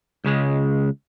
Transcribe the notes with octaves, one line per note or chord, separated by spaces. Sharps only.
C#2 C#3 G#3